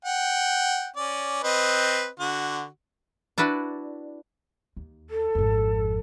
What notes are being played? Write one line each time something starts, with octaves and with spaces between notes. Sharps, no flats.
F#5 G5
C#4 D5
C4 B4 D#5
D3 F#4
D4 E4 F#4 B4 D5
D#2
A4
G#1 F2